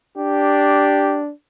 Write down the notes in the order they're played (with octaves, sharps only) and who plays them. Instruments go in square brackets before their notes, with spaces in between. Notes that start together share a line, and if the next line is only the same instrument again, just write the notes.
[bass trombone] D4 [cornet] G4